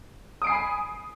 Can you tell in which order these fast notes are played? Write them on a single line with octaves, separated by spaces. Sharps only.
D#6 D7 C7 G#5 B5